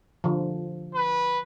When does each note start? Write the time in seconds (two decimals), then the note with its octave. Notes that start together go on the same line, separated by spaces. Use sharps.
0.24 D3 F3
0.95 B4